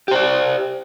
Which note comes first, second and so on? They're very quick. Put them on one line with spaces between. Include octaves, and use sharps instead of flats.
G4 C5 D5